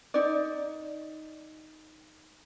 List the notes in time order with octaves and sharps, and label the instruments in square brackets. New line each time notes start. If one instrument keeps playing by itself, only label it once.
[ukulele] D#4 D5